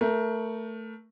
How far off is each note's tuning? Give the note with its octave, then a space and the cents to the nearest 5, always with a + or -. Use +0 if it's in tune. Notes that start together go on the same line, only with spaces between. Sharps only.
A3 +10 A#4 +25